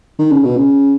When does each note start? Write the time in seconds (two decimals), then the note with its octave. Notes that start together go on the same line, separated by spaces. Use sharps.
0.19 D#3
0.31 C#3
0.44 B2
0.56 C#3